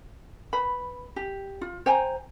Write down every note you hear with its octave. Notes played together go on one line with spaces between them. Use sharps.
B4 B5
G4
F4
C5 G5 G#5 A#5